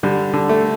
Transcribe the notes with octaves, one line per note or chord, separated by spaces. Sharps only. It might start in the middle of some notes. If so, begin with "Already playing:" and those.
D3 G3
D3
A3